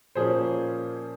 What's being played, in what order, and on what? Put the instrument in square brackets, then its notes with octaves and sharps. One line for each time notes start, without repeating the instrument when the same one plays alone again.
[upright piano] A#2 F3 A#3 C#4 G#4 C5